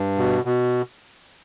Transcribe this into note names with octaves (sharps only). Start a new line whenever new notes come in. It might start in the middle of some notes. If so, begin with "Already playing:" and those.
Already playing: G2
B2
B2